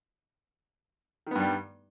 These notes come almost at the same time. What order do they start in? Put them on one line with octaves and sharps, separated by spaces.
D#3 B3 G2 G3